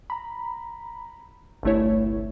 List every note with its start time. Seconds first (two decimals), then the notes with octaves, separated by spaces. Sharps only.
0.10 A#5 B5
1.63 G1 C2 A3 E4 C#5